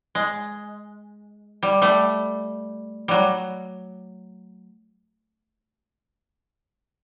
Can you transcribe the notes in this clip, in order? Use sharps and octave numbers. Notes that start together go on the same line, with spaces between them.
G#3
G3
G3 A3
F#3 G3